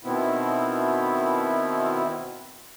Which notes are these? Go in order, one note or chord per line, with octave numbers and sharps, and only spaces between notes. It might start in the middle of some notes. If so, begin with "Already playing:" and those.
B2 D#3 B3 C4 E4